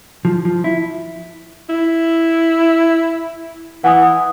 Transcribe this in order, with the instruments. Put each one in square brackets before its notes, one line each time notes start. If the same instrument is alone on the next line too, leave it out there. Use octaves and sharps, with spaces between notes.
[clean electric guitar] F3
F3
E4
[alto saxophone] E4
[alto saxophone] E3 [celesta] F#5 G#5 D#6